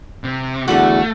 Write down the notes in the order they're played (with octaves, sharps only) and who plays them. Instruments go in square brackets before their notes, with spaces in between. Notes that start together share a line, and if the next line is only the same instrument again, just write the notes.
[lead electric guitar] C3
[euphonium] E2 [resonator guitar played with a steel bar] D3 G3 F#4 [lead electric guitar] A3